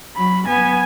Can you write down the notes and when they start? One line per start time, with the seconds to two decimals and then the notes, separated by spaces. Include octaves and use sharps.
0.17 F#3 B5
0.48 B3 G#5